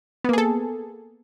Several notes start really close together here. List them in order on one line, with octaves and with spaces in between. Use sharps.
B3 A#3 G#4 A4